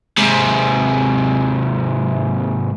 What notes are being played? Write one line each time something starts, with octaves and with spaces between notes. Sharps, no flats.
G#2 C3